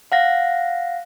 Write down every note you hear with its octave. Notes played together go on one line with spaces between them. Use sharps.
F5 F#5 A#6